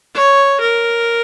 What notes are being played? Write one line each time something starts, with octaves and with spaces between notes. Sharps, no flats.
C#5
A#4